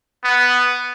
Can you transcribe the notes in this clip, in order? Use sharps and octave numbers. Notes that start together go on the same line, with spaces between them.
B3